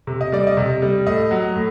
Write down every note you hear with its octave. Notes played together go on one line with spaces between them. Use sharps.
C3
D#5
G3 D5
D#5
C3
G3
A2 D#5
F#3
A2